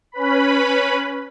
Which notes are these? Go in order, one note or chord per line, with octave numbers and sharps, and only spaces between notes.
C#4 B4 B5